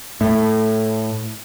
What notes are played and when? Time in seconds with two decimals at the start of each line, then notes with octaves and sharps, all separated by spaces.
0.21 A2 A3